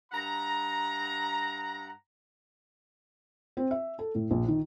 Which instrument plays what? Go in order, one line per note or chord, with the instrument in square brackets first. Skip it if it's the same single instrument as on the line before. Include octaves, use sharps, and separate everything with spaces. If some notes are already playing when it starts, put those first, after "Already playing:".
[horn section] G2 F#5 A#5
[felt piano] C4
E5
A4
A2
A#1
D#3